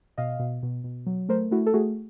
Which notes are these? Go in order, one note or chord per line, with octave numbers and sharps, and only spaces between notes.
B2 D#5 F5
B2
B2
B2
F#3
A3 A#4 C5
A3 E4 F#4
A4
A3 F#4 G#4